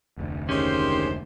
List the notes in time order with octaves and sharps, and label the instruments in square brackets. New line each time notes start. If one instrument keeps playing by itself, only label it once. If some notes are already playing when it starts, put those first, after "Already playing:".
[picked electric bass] F1 D2
[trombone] D#3 [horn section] G#3 G4 C5 [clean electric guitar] C#4